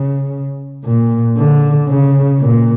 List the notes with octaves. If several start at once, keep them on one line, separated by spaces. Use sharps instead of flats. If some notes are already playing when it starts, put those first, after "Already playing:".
Already playing: C#3
A#2
D3
C#3
A#2